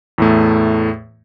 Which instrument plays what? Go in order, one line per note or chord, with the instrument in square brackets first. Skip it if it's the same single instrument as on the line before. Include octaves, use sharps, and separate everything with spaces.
[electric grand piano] E2 A2 A3